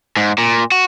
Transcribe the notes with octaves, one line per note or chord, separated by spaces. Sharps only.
G#2
A#2
F#4